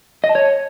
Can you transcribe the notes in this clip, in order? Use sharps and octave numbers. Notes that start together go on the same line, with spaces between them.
D#5
A5
C#5